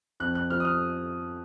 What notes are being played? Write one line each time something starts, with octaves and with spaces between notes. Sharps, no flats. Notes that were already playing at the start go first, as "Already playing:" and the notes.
F2 F#6
F#6
F3 F6
D#6
F6